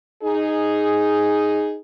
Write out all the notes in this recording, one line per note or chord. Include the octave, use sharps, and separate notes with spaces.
D#4 G#4